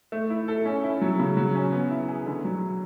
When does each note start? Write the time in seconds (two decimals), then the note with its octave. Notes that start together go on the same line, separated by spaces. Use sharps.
0.12 A3
0.30 E4
0.48 A4
0.65 C#4
0.83 E4
1.01 F#3
1.20 C#3
1.37 F#3
1.55 C#4
1.73 B3
1.90 E4
2.08 G#4
2.26 D3
2.45 F#3